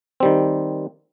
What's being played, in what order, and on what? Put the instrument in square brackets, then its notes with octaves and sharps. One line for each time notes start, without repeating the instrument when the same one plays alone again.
[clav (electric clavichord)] D#3 G3 C4